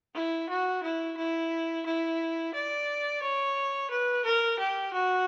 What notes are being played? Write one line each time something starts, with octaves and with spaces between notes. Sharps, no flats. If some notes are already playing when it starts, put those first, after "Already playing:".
E4
F#4
E4
E4
E4
D5
C#5
B4
A#4
G4
F#4